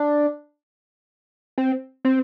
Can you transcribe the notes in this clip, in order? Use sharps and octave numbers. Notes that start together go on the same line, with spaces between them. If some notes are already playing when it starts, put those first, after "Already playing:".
Already playing: D4
C4
C4